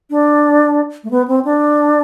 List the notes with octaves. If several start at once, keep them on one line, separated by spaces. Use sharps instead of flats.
D4
A3
B3
C4
D4